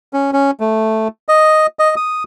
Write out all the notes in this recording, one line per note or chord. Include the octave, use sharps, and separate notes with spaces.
C#4
C#4
A3
D#5
D#5
D#6